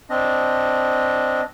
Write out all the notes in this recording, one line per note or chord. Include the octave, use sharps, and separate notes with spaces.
C4 D4 D#5